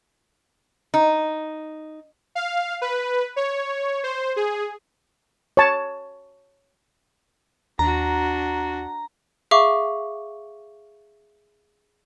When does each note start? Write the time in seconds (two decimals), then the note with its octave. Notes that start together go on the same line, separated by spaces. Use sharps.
0.94 D#4
2.35 F5
2.82 B4
3.36 C#5
4.04 C5
4.36 G#4
5.57 C#5 A5
7.79 D#2 D4 F#4 A#5
9.51 G#4 E5 F5 C#6 D6